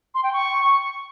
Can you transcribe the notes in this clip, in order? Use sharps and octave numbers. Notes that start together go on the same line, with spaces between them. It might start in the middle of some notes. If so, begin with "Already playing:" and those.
C6
G5
C#6